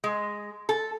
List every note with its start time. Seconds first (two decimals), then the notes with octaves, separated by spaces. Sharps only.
0.04 G#3
0.69 A4